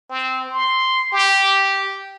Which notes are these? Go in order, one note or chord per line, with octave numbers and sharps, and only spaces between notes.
C4
C6
G4